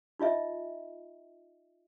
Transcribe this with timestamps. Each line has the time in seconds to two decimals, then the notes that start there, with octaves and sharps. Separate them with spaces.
0.19 D#4 F4 D#5 E5